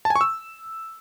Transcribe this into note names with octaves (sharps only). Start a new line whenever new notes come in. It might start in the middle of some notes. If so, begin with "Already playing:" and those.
A5
G#5
C#6
E6